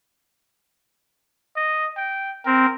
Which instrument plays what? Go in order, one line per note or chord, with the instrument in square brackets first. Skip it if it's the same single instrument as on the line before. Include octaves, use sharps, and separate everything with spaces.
[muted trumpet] D#5
G5
[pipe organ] C4 [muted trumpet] A#4